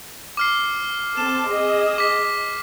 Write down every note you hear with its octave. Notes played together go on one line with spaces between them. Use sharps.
D6 F6 C7
C4 A4 A5 E7
G#4 D#5
D6 B6